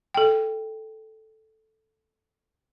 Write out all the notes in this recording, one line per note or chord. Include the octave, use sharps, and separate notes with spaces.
A4 G5